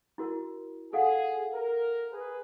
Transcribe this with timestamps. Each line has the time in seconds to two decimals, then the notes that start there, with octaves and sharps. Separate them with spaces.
0.18 E4 F#4 A#4
0.93 G#4 A4 F5 F#5
1.54 A#4
2.12 G#4 B4